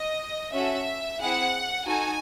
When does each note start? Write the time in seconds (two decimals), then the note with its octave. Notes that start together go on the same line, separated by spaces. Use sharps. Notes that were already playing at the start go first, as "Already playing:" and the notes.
Already playing: D#5
0.53 C#4 F#4 A4 E5
1.19 C4 E4 G#4 F#5
1.85 D#4 F#4 A4 G#5